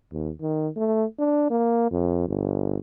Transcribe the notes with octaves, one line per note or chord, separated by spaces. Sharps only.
D#2
D#3
A3
D4
A#3
F2
G1